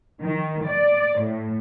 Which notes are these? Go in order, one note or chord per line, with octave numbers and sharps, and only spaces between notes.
D#3
D5
A2